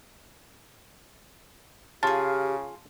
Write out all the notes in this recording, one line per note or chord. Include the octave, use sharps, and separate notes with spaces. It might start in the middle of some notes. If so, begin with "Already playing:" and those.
C#3 F4 G4 G#4 A5